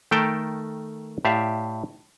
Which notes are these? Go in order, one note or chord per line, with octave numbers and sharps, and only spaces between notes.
D#3 A3 A4 A#4 G5 A5
A2 G4 D5 E5 F5